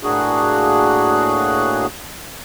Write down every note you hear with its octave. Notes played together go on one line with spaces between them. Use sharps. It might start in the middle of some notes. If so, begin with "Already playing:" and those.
A2 A#3 D4 F#4 G#4 F#6